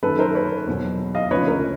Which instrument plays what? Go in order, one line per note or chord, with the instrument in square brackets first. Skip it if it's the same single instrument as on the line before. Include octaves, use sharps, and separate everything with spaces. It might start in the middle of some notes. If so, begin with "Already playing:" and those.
[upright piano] F#2 D#3 F#3 A4 B4
A#4 C5
B4 C#5
E2 B2 F#3
D#5 F5
D2 C#3 F3 B4 C#5
A#4